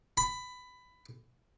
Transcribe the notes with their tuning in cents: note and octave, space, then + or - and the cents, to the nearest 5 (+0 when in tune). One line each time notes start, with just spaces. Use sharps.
B5 +15